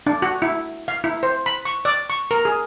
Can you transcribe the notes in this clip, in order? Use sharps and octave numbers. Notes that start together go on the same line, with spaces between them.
D4
F#4
E4
F5
E4
C5
B5
C#6
D5
C#6
A#4
G#4